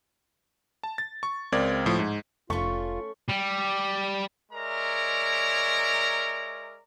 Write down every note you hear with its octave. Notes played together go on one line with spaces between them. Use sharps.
A5
A6
C#6
C#2 C4 A#4 D5 G#6
A2 F3
G#2
F1 A3 C#4 F4 C#6
G3
G#3 A#4 C#5 D5 E5 A#5